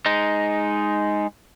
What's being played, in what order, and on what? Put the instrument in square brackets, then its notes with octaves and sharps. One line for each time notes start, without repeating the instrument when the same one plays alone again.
[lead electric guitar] G#3 D#4